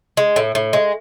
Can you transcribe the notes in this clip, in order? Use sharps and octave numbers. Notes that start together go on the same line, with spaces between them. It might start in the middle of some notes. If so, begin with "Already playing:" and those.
G#3
A2
A2
G#3